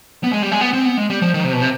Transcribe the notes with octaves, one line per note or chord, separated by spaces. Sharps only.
B3
G#3
G3
G#3
B3
C4
B3
G#3
G3
F3
D#3
C3
B2
C3